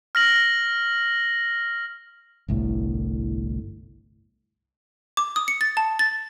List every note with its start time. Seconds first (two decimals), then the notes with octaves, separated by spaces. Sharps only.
0.15 F6 A#6 F#7
2.48 G1 C2 A2
5.17 D6
5.36 D#6
5.48 C#7
5.61 A6
5.77 A5
5.99 A6